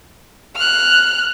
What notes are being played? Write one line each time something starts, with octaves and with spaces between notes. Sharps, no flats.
F6 F#6